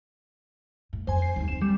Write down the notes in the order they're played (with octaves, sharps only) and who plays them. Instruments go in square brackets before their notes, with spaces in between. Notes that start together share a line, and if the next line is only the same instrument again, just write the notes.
[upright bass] A2
[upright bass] F2 [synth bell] C5 G#5
[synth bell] C7
[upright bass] D#2 D#3
[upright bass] C4 [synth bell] E7
[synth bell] G3